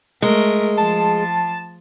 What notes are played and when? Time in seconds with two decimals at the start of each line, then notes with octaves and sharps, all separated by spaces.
0.22 G#3 A3 A#4
0.77 F3 A5